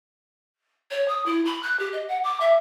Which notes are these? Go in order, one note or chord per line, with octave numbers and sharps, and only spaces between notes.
C#5
D#6
E4
B5
F#6
G4
D#5
F#5
D6
E5